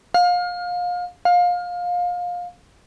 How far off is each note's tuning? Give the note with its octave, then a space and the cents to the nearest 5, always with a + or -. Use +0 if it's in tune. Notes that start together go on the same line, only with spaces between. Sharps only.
F5 +30
F5 +25